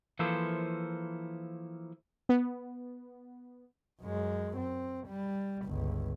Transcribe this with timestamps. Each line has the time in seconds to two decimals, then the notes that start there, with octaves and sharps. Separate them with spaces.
0.19 E3 F3 A#3 E4 A4 C5
2.29 B3
4.02 F#2 G#3
4.57 C4
5.08 G3
5.65 G1 C#2